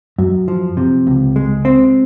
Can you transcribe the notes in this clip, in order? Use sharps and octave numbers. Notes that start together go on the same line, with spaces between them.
F#2
F3
C3
C#2
G#3
C4